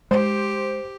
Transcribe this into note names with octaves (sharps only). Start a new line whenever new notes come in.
G#3 G4 C5